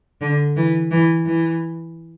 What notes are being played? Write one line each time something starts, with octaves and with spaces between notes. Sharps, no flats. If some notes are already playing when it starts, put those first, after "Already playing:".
D3
E3
E3
E3